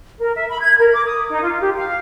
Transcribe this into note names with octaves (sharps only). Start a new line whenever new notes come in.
A#4
E5
B5
G#6
A#4
D6
D#6
D#4
F4
G4
F5